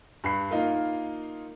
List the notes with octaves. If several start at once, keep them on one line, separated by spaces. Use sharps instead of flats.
G2 B5 C7
A#3 D#4 F4 A#4